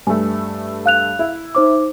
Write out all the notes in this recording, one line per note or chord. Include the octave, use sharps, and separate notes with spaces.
G2 A3 G#5
F5 F#6 F7
E4 E5
D#4 C5 D6